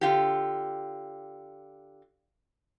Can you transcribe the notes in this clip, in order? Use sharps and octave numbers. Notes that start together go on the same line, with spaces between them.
D3 F4 G4